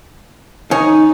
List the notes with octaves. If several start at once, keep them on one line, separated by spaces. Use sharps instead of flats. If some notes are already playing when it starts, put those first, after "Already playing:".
D#3 C#4 D#4 G#4